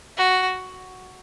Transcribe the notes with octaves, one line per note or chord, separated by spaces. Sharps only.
F#4